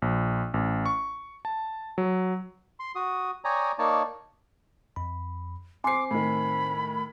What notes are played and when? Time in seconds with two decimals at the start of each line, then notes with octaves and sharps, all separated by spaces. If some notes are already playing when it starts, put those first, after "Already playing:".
0.02 A#1
0.54 A1
0.86 C#6
1.45 A5
1.98 F#3
2.80 C6
2.95 F#4 D#6
3.45 C#5 D5 G5 G#5 A#5 D#6
3.79 A#3 D#4 C#5 D5 A5
4.96 F2 B5
5.84 C4 C5 G#5 C6 D6 C7
6.11 A2 D#3 B5